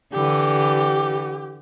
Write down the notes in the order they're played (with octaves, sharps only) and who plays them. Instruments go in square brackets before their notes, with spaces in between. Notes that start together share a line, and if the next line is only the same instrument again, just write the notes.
[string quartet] D3 E3 [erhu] G4